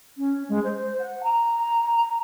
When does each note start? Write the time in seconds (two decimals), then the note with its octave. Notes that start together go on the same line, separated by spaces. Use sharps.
0.17 C#4
0.48 G#3
0.63 C5
0.99 F#5
1.23 A#5